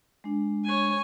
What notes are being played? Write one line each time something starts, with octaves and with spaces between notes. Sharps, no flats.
G#3 D4
C#5 G#5